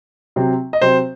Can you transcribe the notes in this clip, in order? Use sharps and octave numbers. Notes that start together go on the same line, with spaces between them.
C3 F#3 C4
D#5
C3 F#3 C4 C5